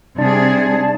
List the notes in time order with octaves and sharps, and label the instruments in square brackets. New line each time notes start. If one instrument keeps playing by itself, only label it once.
[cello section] C3 G3 G#4 [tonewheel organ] D4 A5